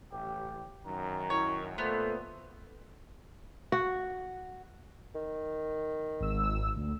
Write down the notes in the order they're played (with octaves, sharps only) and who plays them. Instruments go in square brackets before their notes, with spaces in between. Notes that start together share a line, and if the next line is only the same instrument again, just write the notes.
[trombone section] A1 [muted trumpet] G4
[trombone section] F#2 D#3 [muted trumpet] A#5
[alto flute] E4 [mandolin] C#5
[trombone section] A#2 A3 [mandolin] B3 [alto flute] A4 [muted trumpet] C5
[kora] F#4
[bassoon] D#3
[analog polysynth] G#1 E6
D2